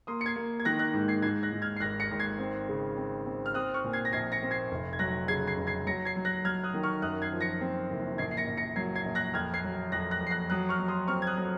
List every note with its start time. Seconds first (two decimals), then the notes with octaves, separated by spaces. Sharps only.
0.07 A#3 C6 D#6
0.21 C#7
0.26 G#6 C7
0.36 A#3
0.60 G#6
0.65 D#3 F#6 A#6
0.79 F#6 A#6
0.93 G#2
1.08 G#6 C7
1.22 G#2 G#6 C7
1.43 F#6 A#6
1.52 G#2
1.62 F6 G#6
1.76 C7
1.80 G#1 F#6 A#6
2.00 A#6 C#7
2.11 G#1
2.19 G#6 C7
2.39 C4
2.69 C#3
2.97 C4
3.26 C4
3.46 F6
3.54 C4 D#6 F#6
3.74 C#6 F6
3.84 A#2
3.93 G#6 C7
4.05 A#6
4.12 A#1 G#6 C7
4.32 A#6 C#7
4.42 C4
4.51 G#6 C7
4.71 F1
4.93 G#6
4.99 F#3 F#6 A#6
5.28 C#3 G#6 C7
5.47 G#6 C7
5.58 F1
5.67 G#6 C7
5.87 F#3 A#6 C#7
6.05 G#6 C7
6.16 F#3
6.25 F#6 A#6
6.44 F#3 F6 G#6
6.64 D#6 F#6
6.74 D#3
6.83 C#6 F6
7.02 F#2 D#6 F#6
7.22 G#6 C7
7.32 F3
7.41 A#6 C#7
7.61 C4
7.90 F#1
8.18 A#1 G#6 C7
8.31 C7
8.37 A#6 C#7
8.47 A#1
8.57 A#6 C#7
8.76 F#3 G#6 C7
8.95 G#6 C7
9.05 A#1
9.15 F#6 A#6
9.34 F2 F6 G#6
9.54 G#6 C7
9.64 F#3
9.92 F2 F#6 A#6
10.11 F#6 A#6
10.21 F2
10.27 C7
10.31 F#6 A#6
10.50 F#3 D#6 F#6
10.69 C#6 F6
10.79 F#3
10.88 C6 D#6
11.08 C4 C#6 F6
11.22 G#6
11.27 D#6 F#6
11.37 F#3